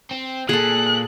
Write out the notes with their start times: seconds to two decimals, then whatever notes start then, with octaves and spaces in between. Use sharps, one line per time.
0.11 C4
0.49 A#2 G#4 A4 F#6